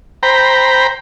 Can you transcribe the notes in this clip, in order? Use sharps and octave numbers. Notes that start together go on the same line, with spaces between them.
C5 G5 A#5 B5